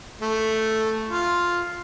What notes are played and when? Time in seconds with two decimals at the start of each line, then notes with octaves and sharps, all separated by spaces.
0.21 A3
1.08 F4